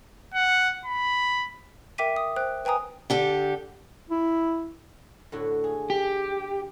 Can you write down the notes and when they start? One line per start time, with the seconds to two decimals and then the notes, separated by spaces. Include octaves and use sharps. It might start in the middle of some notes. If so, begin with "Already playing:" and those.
0.34 F#5
0.86 B5
1.98 A#4 E5 G5 D6 B6 D#7
2.16 D#6
2.36 C5 G5 F#6
2.65 B4 G5 G#5 A#5 D#6
3.10 D3 G4 A4
4.10 E4
5.32 A2 D3 F#4
5.64 G#4
5.90 G4